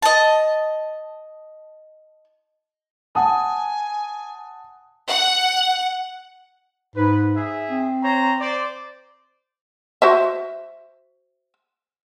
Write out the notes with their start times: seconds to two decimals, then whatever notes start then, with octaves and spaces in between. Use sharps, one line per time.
0.02 D#5 A5
3.15 F#5 G#5 A5 D#6
5.08 F#5
6.96 G#2 B4
7.35 G#4 E5
7.70 C4
8.02 C5 C#5 A#5
8.39 C5 D5
10.02 F#4 C5 E5